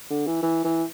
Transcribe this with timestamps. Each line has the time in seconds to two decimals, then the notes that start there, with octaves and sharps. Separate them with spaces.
0.10 D3
0.26 E3
0.42 E3
0.64 E3